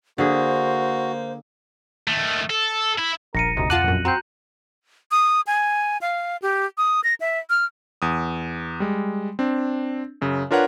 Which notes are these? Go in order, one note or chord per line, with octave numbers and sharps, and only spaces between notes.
D3 A#3 F#4 G#4 C5
D#3 A3
A4
E4
D#1 A#1 A#4 A#6 C#7 D#7
E1 D2 C3 D#4
F2 F4 F#5 A5 D6 F#6 D#7 F#7
A#1 F#2
C4 F#4 A#5 G6
D#6
G#5
F5
G4
D#6
A#6
E5
F6
E2 D#6
G3 G#3
C4 D4
F#2 C#3
D4 F4 A#4 B4 C#5 F#5